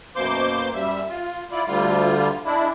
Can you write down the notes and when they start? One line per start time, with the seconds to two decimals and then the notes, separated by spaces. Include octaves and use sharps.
0.16 F#2 B2 A#3 C5 C6 D6
0.74 F#2 G3 E5
1.08 F4
1.51 E4 F4 D5
1.67 D2 D3 G3 F4
2.45 G#3 D4 E4